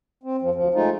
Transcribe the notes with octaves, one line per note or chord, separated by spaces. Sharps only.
C4
F2 F3
D2 F3
G#3 A3 D#4 F4